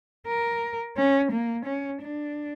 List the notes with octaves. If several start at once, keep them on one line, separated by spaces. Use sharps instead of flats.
A#4
C#4
A#3
C#4
D4